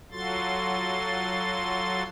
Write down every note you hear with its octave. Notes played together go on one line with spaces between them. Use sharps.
F#3 F4 F#4 A4 C6 A6